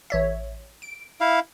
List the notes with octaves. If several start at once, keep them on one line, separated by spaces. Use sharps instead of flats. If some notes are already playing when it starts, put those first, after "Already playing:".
A1 C#5 E5
D7
E4 F5